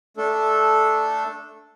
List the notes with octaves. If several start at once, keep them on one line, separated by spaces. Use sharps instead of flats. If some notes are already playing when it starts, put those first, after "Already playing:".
A3 D4 A4